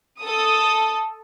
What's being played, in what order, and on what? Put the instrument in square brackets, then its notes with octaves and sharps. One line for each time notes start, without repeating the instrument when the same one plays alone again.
[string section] A4 D#6